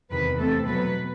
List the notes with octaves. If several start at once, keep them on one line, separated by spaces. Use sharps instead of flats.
E2 C3 D#3 B4
C3 E3 A3 C4 A4
B2 F#3 B3 B4